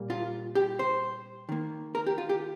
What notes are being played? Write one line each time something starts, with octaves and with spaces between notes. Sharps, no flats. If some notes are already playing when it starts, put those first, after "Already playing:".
Already playing: A#2 G3 A#3
F4
G4
C5
D#3 A#3
A#4
G4
F4
G4